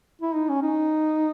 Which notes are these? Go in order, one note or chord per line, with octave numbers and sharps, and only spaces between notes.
E4
D#4
C#4
D#4